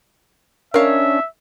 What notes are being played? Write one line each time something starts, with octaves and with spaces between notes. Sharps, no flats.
D#3 C#4 D4 A#4 C#5 E5 F5